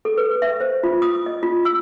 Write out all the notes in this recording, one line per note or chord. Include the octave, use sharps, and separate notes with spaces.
A4
B4
E5
C5
F4
D#6
D#5
F4
E6